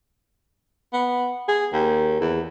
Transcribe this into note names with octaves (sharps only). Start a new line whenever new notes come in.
B3
G#4
D#2
E2